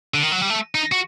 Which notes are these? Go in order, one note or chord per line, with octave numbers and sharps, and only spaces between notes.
D3
D#3
F#3
G3
A3
D#4
F#4